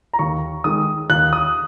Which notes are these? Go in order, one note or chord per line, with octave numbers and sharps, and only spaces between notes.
A#5
D#2 C#6
D#3 G#3 D#6
D#2 F#6
D#6